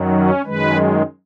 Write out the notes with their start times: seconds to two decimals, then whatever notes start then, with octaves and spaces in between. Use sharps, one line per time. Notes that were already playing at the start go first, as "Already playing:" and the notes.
Already playing: F#2 D#3 F#3
0.10 C#4
0.45 F#2 D#3 G#3 B4